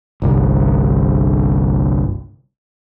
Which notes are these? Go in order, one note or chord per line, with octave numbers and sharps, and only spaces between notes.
G1 C2